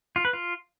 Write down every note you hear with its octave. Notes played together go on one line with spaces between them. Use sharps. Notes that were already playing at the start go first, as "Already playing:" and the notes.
F4
B4
F4